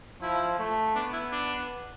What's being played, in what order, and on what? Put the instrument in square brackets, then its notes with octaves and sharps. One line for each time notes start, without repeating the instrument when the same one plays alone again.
[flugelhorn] F3 [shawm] E4
[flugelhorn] A3
[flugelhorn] B3 [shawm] D4
[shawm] E4
D4